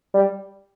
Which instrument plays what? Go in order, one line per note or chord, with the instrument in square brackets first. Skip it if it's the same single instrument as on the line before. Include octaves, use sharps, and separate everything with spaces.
[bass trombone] G3